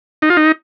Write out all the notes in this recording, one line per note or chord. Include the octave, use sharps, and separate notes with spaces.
D#4
F4
D#4